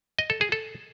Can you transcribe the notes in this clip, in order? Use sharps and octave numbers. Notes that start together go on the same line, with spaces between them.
D#5
A4
G#4
A4